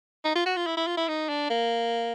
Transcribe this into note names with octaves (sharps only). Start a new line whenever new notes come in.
D#4
F4
F#4
F4
E4
E4
F4
E4
D#4
D4
A#3